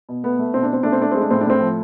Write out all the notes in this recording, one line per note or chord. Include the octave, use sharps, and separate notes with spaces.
B2
A3 B3
A3
B2 C4
D4
B2 C4
A3 D4
C4
A3 D4
G#3 C4
D4
A2 C4
D4
A2 C4
F3